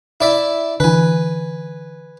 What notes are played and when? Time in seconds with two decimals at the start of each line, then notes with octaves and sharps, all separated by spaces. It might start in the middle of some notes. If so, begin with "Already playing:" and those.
0.21 E4 D5 E5
0.80 D3 E3 B4 G#5